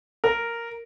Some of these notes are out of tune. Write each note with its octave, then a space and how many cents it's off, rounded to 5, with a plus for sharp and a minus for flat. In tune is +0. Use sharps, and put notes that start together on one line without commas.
A#4 -5